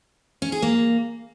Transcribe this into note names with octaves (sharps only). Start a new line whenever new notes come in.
C#4
G#4
A#3